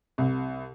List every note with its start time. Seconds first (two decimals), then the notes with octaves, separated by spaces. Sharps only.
0.18 C2